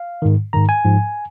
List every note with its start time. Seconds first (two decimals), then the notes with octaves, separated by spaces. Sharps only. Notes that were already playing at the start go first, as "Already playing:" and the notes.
Already playing: F5
0.22 G#2 D#3
0.53 G#2 D#3 A#5
0.69 G#5
0.85 G#2 F3